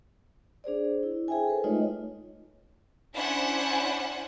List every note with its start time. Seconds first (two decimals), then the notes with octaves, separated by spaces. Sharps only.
0.64 D4 G#4 C5 D5
1.03 E4
1.28 G#4 C5 E5 G5 G#5
1.47 A4 B4
1.64 G#3 A3 D#4 F4 C#5 D#5
3.15 C#4 D4 E4 C5 F#5 G#5